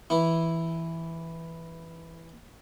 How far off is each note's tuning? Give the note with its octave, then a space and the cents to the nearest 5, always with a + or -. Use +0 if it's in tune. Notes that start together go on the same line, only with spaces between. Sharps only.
E3 +0 E4 +0